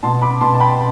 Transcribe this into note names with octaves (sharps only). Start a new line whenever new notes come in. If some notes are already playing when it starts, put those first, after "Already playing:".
B2 A5 C6
B5 D6
B2 A5 C6
A5
G5 B5